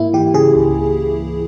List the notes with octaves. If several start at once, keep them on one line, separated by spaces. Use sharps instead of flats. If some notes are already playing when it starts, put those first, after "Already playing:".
Already playing: G#2 A#3 E4
E3 G4
C#3 G#4
C#2